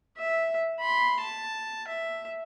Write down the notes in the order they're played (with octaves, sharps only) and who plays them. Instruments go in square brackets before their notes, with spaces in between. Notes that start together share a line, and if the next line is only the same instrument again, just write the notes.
[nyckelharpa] E5
B5 C6
A5
E5